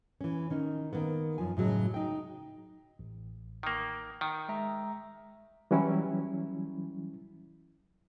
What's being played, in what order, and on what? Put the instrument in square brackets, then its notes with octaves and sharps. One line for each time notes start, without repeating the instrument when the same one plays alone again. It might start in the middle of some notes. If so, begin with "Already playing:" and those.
[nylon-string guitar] E3 C#4
D#3 C#4 D#4
D#3 A#3 B3
F#2 F3 G#5
A2 C#3 F#3 G#3 A5
D#4 G5
[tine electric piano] A1
[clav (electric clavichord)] D#3 A#3
D#3
[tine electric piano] G#3 E5 A#5
[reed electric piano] E3 F#3 G3 C#4 E4